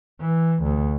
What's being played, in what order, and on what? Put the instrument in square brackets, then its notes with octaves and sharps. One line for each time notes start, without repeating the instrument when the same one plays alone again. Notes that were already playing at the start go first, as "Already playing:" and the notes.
[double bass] E3
D2